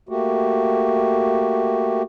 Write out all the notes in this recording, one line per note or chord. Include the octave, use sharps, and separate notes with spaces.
A3 A#3 F#4 G4